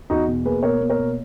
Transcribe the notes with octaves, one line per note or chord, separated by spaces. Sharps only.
E2 D#4 F#4
B2
A#3 G#4 B4
B2 A#4 C#5
A#3
A#4 C#5
B2